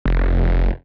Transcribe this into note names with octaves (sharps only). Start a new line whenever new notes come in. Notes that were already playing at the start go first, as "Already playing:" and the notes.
F1